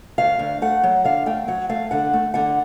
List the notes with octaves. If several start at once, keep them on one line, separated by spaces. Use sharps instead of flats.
D2 F5
D2
A3 F#5
F#3
D3 F5
A3 G5
F#3 F#5
A3 F5
D3 F#5
A3
D3 F#5